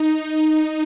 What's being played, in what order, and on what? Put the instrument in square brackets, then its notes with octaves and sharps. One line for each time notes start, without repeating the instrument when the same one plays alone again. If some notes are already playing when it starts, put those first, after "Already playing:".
Already playing: [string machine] D#4